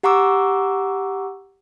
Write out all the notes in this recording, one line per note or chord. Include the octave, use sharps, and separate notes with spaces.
G4 F#5 A#5 C#6 D6 E6